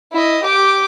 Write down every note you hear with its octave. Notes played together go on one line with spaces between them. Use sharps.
E4 D#5
G4 D6